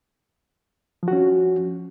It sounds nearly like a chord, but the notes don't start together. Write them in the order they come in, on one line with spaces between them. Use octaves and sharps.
F3 F#4 C#4